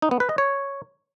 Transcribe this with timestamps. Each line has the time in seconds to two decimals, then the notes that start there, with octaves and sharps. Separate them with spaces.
0.02 D#4
0.11 B3
0.20 B4
0.29 D#5
0.38 C#5